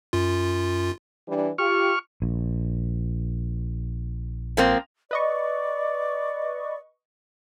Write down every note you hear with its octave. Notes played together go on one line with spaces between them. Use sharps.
F#2 F4
E3 G3 D4
F4 G4 C#6 F6
A#1
F3 A#3 C4
B4 D5 D#5 C#6